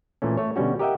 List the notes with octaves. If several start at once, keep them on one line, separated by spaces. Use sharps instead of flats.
A#2 E3 A3 C#4
A3 C#5
B2 D3 G3 C#4 F#4
G4 A#4 D#5 E5 F#5 G5